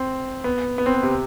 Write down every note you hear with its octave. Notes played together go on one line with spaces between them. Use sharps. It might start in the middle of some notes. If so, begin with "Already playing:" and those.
Already playing: C4
B3
B3
C4
B3
C3